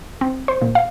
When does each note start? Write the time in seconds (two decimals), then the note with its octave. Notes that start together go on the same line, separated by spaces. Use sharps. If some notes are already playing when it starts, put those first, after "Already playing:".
0.21 C4
0.48 C5
0.62 A#2
0.75 F5